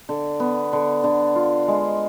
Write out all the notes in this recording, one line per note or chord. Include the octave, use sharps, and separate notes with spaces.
D3
B3
D3
D3
F4
G#3